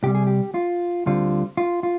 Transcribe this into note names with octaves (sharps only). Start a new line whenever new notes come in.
C2 C3 G3 G4
G#4
G4
F4
D2 D3 G3 C4 F4
F4
F4